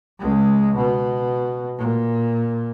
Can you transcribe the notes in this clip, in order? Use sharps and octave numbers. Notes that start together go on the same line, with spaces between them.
C#2 G#3
B2
A#2